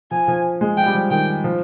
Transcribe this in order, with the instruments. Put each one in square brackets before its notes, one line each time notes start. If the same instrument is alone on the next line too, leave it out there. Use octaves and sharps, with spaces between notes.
[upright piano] F3 [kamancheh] G#5
[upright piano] F3
G#3
[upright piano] F3 [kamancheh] G5
[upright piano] G3
F3
[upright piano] D#3 [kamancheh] G5
[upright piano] F3